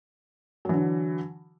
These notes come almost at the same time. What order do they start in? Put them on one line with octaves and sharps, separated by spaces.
F#3 E3 D3